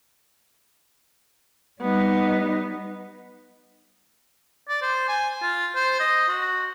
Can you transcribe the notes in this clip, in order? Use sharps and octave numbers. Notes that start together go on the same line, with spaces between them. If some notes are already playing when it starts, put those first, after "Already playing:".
G3 B3 D#4
D5
C5
G#5
F4
C5
D#5
F#4